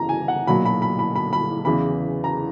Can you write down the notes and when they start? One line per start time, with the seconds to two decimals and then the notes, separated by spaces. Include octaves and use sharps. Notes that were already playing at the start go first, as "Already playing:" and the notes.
Already playing: F#1 C#3 E3 A#5
0.09 G#5
0.28 F#5
0.47 B1 A#2 F#3 B5
0.65 B5
0.82 B5
0.99 B5
1.16 B5
1.33 B5
1.65 E2 C#3 E3 B5
2.24 A#5